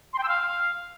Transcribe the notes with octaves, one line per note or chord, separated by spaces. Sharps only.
C6
G5
E6
F5